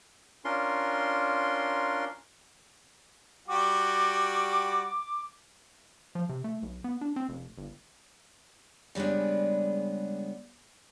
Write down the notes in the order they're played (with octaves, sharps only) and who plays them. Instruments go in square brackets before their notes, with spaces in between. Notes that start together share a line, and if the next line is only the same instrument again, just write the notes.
[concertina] C#4 D4 F4 A#4 C6
[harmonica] G3 F#4 G4 [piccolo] D6
[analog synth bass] F3
C3
A3
B1
B3
D4
C4
F1
G1
[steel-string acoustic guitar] C#3 G3 G#3 B3 D4